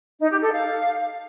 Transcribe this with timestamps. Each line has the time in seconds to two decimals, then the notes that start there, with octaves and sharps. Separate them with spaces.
0.19 D#4
0.30 G4
0.42 A4
0.53 F5